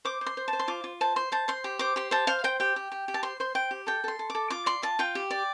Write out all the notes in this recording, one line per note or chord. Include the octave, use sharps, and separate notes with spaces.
C5 D6
C5
C6
C5
A5
C5
C6
F4 D6
F4
C5 A5
C5 C6
C5 A5
C5 C6
G4
C5 D6
G4 C6
C5 A5
C5 F5
C5 G5
G4 G5
G4
G4
G4
A5
C5 C6
C5 C6
C5 G5
G4
A4 G5
A4 C6
A4
D6
A4
F4 D6
D5 C6
F4 A5
F4 G5
G4
D5